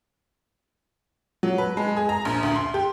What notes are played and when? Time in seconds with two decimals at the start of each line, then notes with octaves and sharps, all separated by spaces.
1.43 F#3
1.58 B4
1.77 G#3
1.97 G#4
2.09 A#5
2.25 A#1
2.43 D2
2.56 C6
2.74 G4